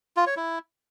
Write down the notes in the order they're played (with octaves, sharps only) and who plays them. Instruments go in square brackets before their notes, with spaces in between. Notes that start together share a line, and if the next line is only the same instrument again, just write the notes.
[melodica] F4
C#5
E4